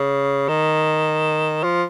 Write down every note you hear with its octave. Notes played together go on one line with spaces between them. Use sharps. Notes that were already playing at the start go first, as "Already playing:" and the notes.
Already playing: C#3
D#3
F3